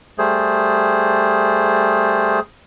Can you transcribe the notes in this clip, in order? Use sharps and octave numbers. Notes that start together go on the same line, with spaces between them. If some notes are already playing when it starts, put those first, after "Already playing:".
G3 A3 G#4 C5